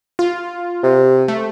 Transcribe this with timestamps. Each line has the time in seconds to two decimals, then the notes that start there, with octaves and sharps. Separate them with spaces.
0.19 F4
0.83 C3
1.28 A3